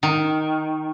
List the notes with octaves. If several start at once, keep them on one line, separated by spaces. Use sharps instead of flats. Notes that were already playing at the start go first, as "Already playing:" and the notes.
D#3